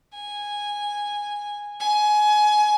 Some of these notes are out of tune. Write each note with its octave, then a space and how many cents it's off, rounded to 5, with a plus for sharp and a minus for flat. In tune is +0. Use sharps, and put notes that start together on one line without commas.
G#5 -10
G#5 +20